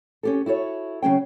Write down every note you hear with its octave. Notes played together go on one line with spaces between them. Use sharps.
C#4 G4 A4
E4 F#4 A4 C#5
C#3 F#3 C#4 G5